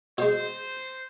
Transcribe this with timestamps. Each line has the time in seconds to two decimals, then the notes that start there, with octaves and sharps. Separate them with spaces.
0.18 B2 G#3 C5